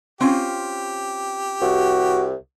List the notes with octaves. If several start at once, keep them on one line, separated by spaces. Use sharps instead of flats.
C4 C#4 F4 G4
C2 F#4